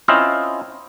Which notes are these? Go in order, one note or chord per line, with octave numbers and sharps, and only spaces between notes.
C4 C#4 E4 F4 C5 D#5